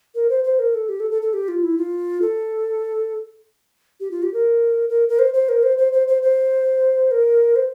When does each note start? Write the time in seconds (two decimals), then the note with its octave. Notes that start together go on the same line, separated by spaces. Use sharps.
0.15 A#4
0.30 C5
0.44 C5
0.59 A#4
0.75 A4
0.89 G4
1.00 A4
1.11 A4
1.22 A4
1.34 G4
1.48 F4
1.63 E4
1.78 F4
2.22 A4
4.00 G4
4.11 F4
4.23 G4
4.34 A#4
4.89 A#4
5.09 A#4
5.19 C5
5.34 C5
5.49 A#4
5.63 C5
5.78 C5
5.93 C5
6.08 C5
6.23 C5
7.11 A#4
7.56 C5